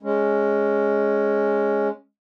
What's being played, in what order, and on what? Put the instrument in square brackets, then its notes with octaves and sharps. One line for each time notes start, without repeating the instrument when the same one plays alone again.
[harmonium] G#3 C#4